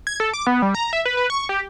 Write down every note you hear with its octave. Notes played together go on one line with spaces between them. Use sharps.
G#6
A4
D6
B3
G3
A#5
E5
B4
B4
C#6
G4